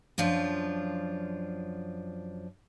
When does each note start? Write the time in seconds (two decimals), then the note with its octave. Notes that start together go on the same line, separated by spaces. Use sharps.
0.18 F#2 F3 D4 F4